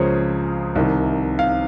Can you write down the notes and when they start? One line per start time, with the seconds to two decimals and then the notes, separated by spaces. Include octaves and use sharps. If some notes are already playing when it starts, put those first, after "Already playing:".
Already playing: C#2 C#3 F3 G#4 A#4 C5 C#5
0.76 C2 C3 D#3
1.39 F5